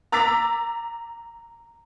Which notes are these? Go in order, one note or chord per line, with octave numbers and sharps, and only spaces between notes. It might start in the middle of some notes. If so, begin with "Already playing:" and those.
A#5 D6 E6 A6 B6